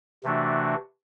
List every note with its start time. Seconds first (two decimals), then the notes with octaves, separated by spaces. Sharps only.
0.23 C3 E3 A3 D4 F#4